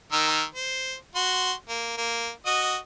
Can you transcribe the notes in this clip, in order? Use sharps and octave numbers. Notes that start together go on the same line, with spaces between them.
D#3 A#4 E6
C5
F#4 C6
A#3
A#3
F#4 D#5 D#6